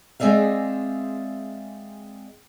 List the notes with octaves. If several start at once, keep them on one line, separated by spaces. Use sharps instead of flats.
G#3 C4 G#4 D5 E5 F5